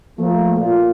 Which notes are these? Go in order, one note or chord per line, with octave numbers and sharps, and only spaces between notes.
F3 A3 A#3
A#2 F4